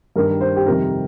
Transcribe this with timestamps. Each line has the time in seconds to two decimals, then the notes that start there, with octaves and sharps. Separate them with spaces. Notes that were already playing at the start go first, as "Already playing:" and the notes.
0.16 G2 D#3 G3 A#4
0.41 C5
0.56 G4
0.66 F2 C3 D#3 G3 A#4